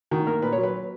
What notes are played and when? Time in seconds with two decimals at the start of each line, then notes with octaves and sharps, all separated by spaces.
0.11 D#3 F#4
0.27 A#3 A#4
0.42 A#2 B4
0.52 C#5
0.58 F#3
0.63 B4